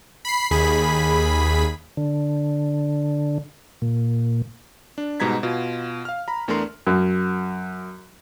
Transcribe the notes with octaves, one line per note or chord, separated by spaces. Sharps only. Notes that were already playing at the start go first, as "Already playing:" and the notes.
B5 C7
D#2 G#4 B5 B6
D3
A#2
D4
G#2 B2 G3 A#5 G#6 B6
B2 F4
F5 F6
A#5 B5
E2 A3 D4 A#4 C6
F#2